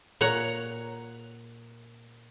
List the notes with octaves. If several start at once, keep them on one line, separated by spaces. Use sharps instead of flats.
A#2 C#5 F#5 A#5